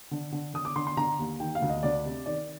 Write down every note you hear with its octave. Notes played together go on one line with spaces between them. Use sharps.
D3
D3
D3 D#6
D6
D3 C6
C6
D3 A#5
D#2
D#3 G5
F5
D2
D#5
D2 D5
C3
D#3 D5